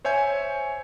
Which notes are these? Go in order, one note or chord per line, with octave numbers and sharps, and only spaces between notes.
C5 C#5 E5 G#5 G6